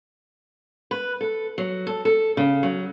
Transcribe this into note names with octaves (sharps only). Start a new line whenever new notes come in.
B4
A4
F#3
A4
A4
C#3
F#3